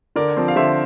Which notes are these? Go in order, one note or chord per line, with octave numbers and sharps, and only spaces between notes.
D3 A#4 D5
F3 C4
F5
D3 C5 E5